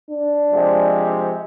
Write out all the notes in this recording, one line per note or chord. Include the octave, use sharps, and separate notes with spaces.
D4
C3 F3 G#3